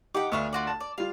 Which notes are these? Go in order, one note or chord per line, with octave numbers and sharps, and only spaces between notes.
D#4 G4 F#5 G5 D6
D2 B3 D4 E5 F5 C#6
F4 F#4 D5
A5
D5
G3 F4 F5